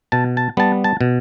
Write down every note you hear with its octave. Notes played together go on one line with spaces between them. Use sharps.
B2 A5
A5
G3 B3 A5
A5
B2